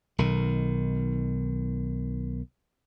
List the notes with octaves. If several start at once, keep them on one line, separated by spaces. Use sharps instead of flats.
B1 D#3